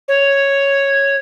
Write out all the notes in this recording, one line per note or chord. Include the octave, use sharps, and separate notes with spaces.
C#5